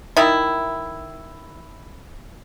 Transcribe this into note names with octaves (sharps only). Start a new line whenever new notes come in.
D#3 E4